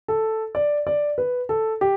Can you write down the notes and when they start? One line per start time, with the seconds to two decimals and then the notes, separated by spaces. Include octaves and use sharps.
0.08 A4
0.55 D5
0.87 D5
1.18 B4
1.49 A4
1.81 G4